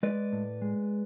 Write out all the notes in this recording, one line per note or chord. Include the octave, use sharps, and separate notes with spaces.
G#3 B4 D5
A2
G#3